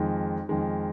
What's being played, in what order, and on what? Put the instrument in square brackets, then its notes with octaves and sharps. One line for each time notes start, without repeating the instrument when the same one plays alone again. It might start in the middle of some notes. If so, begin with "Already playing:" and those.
Already playing: [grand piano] F2 D#3 G#3
F2 D#3 G#3